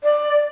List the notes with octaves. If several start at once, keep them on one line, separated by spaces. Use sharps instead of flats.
D5